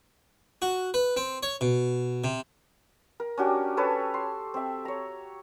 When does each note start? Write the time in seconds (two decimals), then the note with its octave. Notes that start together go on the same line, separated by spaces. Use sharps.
0.62 F#4
0.94 B4
1.17 C4
1.43 C#5
1.61 B2
2.24 C3
3.20 A#4
3.38 C#4 D4 F#4 G4
3.77 A4 B4 C#5 A5
4.14 C6
4.54 C4 E5
4.85 C#5 A#5